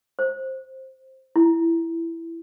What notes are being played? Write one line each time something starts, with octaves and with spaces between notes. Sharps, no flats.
C5
E4